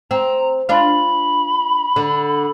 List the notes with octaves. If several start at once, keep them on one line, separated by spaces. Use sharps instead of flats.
C4 A#5
D4 F4 B5
D3